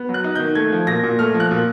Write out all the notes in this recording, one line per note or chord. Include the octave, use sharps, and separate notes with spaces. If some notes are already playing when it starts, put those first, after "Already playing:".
Already playing: B3
F#3
F#6
D#4
D#3 G6
A3 G#6
F3
A#2 A#6
A#2
A3 F6
F3
F#6
A#2